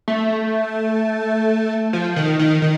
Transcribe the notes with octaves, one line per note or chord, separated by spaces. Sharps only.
A3
F3
D#3
D#3
D#3